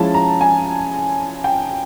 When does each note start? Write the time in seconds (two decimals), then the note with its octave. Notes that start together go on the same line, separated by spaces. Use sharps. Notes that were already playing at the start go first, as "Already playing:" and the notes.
Already playing: F3 G#3 C#4 E4 A5
0.14 A#5
0.41 G#5
1.44 G5